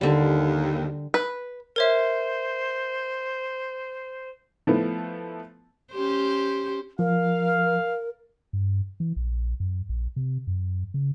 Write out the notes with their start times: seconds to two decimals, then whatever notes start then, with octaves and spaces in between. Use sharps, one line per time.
0.01 D#2 D3 G3
1.14 B4
1.76 A#4 C5 C#5 E5
4.67 F3 A3 B3 E4
5.93 C#4 G4 C5
6.99 F3 A#4 F5
8.53 G2
9.00 E3
9.16 A#1
9.60 F#2
9.89 A#1
10.16 C3
10.47 F#2
10.94 C#3